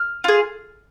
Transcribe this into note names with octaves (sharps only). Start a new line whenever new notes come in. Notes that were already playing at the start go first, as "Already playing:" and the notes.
Already playing: F6
F4 G#4